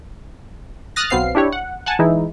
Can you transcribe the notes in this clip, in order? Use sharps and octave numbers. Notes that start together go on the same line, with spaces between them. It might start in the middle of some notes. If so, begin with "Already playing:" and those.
D#6 F6 F#6 A6 A#6
B1 F#3 B3 C4 F5 C7
D4 E4 G4 C#5
F#5
F#5 G#5 A5
E3 G#3 D#4 E4